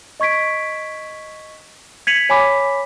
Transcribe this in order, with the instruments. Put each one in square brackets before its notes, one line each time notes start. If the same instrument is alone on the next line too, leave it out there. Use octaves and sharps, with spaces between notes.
[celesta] D#5 C#6 G#6 B6 D7
G#6 B6 C#7 D#7 F7 F#7
C#5 G#5 B5 D6 B6